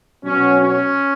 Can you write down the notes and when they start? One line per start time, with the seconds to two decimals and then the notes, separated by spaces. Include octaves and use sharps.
0.24 B2 F#3 C#4
0.61 C#4